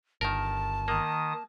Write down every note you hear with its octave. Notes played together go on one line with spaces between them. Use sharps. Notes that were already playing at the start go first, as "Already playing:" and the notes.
G1 D#3 A#4 A5
D#3 A#3 D#6